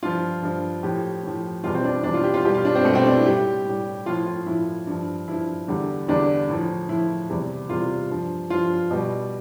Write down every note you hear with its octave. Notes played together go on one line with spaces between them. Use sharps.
G2 F3 F4
G2 F3
A2 F3 G4
A2 F3
E2 B2 G3 F4
C4
D4
E2 B2 G3 D4
F4
G4
F4
B2 G3 G4
F4
D4
C4
B2 G3 A3
C4
D4
E4
A2 G3 G4
A2 G3
A2 F3 F4
F4
A2 F3 E4
G2 F3
G2 F3 E4
E2 D3 G3
E2 D3 G3 D4
A2 F3
A2 F3 E4
E2 C3 G3
E2 C3 G3 F4
G2 F3
G2 F3 F4
B2 G3